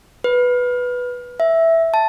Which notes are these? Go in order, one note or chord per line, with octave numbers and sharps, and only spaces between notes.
B4
E5
A5